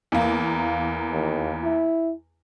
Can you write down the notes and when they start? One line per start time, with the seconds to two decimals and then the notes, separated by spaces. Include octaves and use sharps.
0.12 E2 A#3
1.13 D#2
1.64 E4